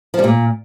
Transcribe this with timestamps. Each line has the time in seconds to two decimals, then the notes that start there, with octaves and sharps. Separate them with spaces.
0.14 F3
0.19 G3
0.24 A#2